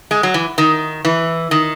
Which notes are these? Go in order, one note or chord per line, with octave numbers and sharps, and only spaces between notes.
G#3
F#3
E3
D#3
E3
D#3